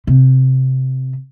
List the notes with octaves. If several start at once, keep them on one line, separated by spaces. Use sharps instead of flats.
C3